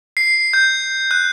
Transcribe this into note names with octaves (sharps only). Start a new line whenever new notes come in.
C7
G6
F#6